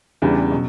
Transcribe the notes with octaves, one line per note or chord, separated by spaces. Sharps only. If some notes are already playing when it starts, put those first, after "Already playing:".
E2 C#3 E3 G3 D4
B2 F#3